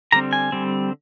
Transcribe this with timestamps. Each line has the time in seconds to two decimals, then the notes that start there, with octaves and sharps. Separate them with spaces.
0.12 D3 G3 C4 A#5
0.33 G#5
0.52 D3 G3 C4